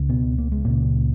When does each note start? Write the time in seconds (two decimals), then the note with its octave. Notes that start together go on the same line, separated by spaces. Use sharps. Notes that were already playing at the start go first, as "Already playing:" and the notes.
Already playing: C#2 C#3
0.09 B2 B3
0.38 A#3
0.52 G#3
0.65 C#2 A#2 C#3 A#3